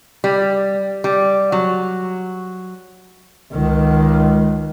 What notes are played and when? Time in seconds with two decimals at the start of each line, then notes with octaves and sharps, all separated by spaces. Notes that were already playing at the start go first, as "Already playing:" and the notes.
0.24 G3
1.04 G3
1.52 F#3
3.52 C#2 D#3